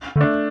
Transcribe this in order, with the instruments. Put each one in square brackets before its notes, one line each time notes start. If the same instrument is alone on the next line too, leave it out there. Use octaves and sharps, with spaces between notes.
[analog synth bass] D3 [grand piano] A3 D4